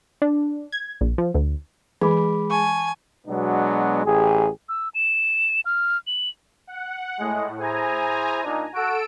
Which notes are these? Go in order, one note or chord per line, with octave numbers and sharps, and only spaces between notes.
D4
G#6
A#1
F3
D2
E3 G#3 B5 D6
G#5 A5 C#6
B2 F#3 G#3 B3 D4
A1 G4 G#4
E6
E7
F6
F#7
F#5
A2 G#3
E4 G#4 C5 G#5 A#5
A#2 D4 D#4
F#4 A4 E6 D7